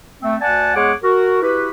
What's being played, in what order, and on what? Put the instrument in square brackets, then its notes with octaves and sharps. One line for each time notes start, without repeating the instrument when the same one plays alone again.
[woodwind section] A3 C4
D2 D5 F#5 G#5 A5
E2 G#3 G#4 C#5 F#5 D6
F#4 A#4
E4 F#4 G4 B4